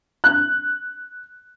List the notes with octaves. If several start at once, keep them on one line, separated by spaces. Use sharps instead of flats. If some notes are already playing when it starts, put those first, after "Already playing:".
F#6